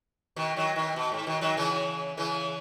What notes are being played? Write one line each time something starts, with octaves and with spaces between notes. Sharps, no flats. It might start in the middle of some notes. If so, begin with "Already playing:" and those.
B2 D#3
D#3 F#3
B2 D#3
B2
G#2
B2 D#3
D#3 F#3
C#3 E3
C#3 E3